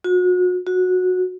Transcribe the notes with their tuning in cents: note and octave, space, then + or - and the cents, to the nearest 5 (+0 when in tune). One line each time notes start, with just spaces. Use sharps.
F#4 -35
F#4 -15